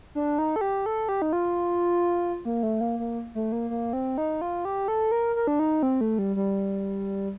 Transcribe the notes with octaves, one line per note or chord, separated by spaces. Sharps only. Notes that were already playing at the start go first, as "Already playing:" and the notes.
D4
D#4
A4
G4
A4
G4
D#4
F4
A#3
A3
A#3
A#3
A3
A#3
A#3
C4
D#4
F4
G4
A4
A#4
A#4
D4
D#4
C4
A3
G3
G3